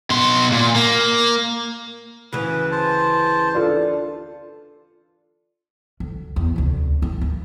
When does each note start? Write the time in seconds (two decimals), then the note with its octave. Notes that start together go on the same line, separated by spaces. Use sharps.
0.10 B2 C6
0.52 A#2
0.76 A#3
2.32 D2 C#3 E3 B4
2.72 C5 A5
3.54 D4 F4 A4
6.00 D2
6.36 E2
6.56 D2 C3
7.02 E4
7.21 D#2